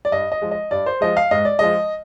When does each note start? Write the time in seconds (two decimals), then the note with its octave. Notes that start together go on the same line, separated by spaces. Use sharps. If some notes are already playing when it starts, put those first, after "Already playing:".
0.05 D5
0.12 G2 D#5
0.32 D#5
0.42 F3 G#3
0.51 D#5
0.71 G2 D5
0.86 C5
1.01 F3 G#3 D#5
1.17 F5
1.31 G#2 D#5
1.45 D5
1.59 F3 G#3 D#5